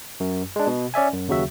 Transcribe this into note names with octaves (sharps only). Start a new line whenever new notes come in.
F#2
G#3 D4
B2
C#4 D5 E5 G#5
F#2
D#2 C#3 F#3 F#4 E5